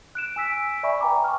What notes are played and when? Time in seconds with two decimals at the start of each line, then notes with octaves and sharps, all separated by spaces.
0.15 F#6 D7 E7
0.36 G#5 E6 B6 D7
0.83 D5 E5 G#5 B5 C#6
1.01 B4 G5 G#5 A#5 B5 D6
1.24 C#6 F6